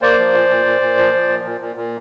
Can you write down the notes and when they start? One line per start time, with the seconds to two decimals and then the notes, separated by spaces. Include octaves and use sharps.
0.02 A#3 C5 D5
0.19 F3
0.34 A#2
0.49 A#2
0.66 A#2
0.81 A#2
0.97 F3
1.14 F3
1.29 A#2
1.44 A#2
1.60 A#2
1.76 A#2